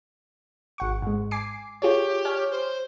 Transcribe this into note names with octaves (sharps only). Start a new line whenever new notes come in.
G#1 F#5 C#6
G#2 G#3
G#5 D6 C7
F4 G4 G#4 C#5
C#5 G#5 F6
C5